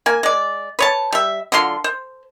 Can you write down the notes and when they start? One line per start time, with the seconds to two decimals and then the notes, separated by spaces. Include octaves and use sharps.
0.06 A#3 G#5
0.23 G#3 D5
0.79 B4 C#5 A5
1.13 G3 E5
1.52 D3 F#3 F4 C6
1.84 C5